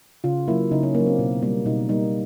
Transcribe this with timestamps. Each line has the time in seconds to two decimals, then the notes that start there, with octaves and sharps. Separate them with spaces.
0.24 C#3 F4
0.48 F#3 A#3 E4
0.71 C#3 D#4
0.83 C#4
0.95 A#3
1.00 F#3
1.06 C4
1.19 B2
1.42 G3 A#3
1.66 B2 D#4
1.89 G3 A#3 D#4